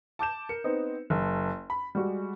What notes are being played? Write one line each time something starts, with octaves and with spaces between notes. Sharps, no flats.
A5 D6 G6 E7
A#4 C#7
B3 C4 D#4
F#1
B5
G3 G#3 F#4